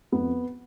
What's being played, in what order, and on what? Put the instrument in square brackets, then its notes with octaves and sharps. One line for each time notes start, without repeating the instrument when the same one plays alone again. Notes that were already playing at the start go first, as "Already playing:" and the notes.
[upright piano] F2 B3